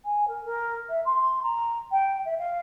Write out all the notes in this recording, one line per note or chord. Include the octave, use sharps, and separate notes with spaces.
G#5
A#4
A#4
E5
C6
A#5
G5
E5
F5